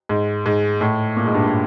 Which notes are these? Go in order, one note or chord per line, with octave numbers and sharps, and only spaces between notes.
G#2
G#2
A2
A#2
G#2
G2